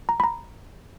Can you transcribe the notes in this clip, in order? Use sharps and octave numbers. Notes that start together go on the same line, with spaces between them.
A#5
B5
A#5